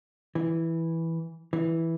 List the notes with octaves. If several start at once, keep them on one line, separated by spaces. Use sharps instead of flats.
E3
E3